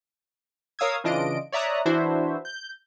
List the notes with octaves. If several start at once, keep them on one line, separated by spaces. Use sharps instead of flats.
A#4 C#5 F5 D#6 E6 G#6
C#3 E3 D4 F4 D#5 D7
C#5 D5 E5 A#5 D#6 F#6
E3 D4 E4 F#4 C5 E5
G6